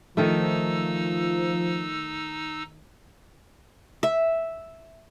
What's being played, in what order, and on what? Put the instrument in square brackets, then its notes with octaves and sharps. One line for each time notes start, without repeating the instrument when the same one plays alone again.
[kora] D#3 A3 [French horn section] F3 [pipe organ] D#4 E6
[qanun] E5